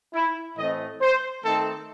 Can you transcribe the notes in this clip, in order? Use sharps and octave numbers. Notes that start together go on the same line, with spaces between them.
E4
A2 E3 A3 C4 D#5
C5
D#3 A3 C4 D#4 A4